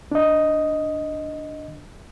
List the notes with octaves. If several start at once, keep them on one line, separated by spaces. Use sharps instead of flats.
D4 D#5